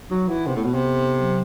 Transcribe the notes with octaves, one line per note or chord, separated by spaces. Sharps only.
F#3 D#4
E3 F#5
C3 B3
A2
B2 B3
C3
A4
D#4
F#3